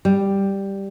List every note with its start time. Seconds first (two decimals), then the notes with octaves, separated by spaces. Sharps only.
0.05 G3